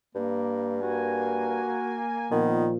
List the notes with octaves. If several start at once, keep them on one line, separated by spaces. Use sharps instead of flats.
G2 A#3
A#3 F#4 G#5
A#2 D#3 F3 B3